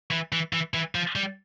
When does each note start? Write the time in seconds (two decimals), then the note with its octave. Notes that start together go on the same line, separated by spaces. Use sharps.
0.11 E3
0.32 E3
0.53 E3
0.74 E3
0.95 F3
1.16 G3